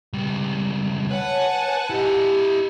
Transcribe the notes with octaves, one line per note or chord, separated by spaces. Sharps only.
C#2 G3
B4 C#5 F#5 G#5 A5
E4 G4 D#5